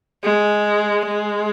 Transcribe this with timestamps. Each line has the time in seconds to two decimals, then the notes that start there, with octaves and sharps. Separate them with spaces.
0.23 G#3
1.06 G#3